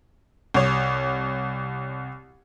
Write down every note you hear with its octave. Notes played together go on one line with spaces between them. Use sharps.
C2 C#5